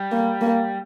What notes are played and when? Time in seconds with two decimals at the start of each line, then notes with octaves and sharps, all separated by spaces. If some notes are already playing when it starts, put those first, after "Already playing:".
Already playing: G3
0.12 A#3
0.41 A#3